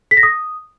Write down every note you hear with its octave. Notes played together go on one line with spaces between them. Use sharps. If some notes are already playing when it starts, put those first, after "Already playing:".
B6
A#6
D#6